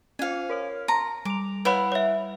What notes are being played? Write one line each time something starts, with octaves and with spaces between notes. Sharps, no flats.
C#4 F4 C5 F5 G#5
A#4 C#5 F6
A5 A#5 C6
G3 D6 F7
E4 B4 C#5 F5 F#5 B5
C#5 E5